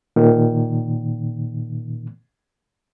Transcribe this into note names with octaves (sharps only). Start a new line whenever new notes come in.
A#2 D#3